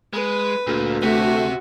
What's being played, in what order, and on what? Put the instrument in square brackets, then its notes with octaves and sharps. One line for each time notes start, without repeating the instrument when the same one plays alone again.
[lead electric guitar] G#3 [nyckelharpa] B4
[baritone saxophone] D2 [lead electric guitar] A#2
[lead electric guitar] C3 [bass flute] A3 [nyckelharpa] F#4